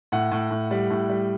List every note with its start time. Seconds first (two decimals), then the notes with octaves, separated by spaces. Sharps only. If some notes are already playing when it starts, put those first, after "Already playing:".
0.12 A2 F#5
0.32 A2
0.51 A2
0.71 G3
0.90 A2
1.10 G3